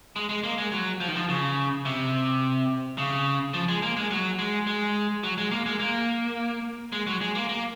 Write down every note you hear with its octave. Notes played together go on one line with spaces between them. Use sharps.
G#3
G#3
A#3
G#3
F#3
F3
D#3
F3
C#3
C3
C#3
F3
G#3
A#3
G#3
F#3
G#3
G#3
F#3
G#3
A#3
G#3
A#3
G#3
F#3
G#3
A#3
A#3